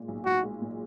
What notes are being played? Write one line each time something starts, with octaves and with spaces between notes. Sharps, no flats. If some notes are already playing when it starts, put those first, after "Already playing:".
Already playing: A#2 G#3
B1
B1 F#4
G#3
A#2